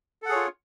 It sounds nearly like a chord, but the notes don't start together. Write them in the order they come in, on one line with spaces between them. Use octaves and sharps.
A4 F#5 G#4 C#5 F4